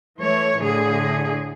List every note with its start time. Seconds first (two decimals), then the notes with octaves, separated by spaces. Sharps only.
0.19 E3 A3 C#5
0.59 A2 D3 G#4